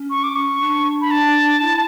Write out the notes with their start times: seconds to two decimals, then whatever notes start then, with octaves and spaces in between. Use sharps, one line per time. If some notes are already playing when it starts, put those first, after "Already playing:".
Already playing: C#4
0.10 C#6
0.24 D6
0.36 C#6
0.61 D4
1.01 B5
1.11 A5
1.61 E4